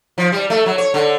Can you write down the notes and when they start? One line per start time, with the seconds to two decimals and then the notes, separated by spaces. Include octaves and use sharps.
0.18 F3
0.32 G3
0.50 A3
0.66 F#3
0.78 C#5
0.94 D3